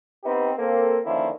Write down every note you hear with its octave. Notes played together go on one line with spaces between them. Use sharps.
B3 C4 D#4 G4 B4
A#3 C4 A4
D3 D#3 F3 A#3 C#4 E4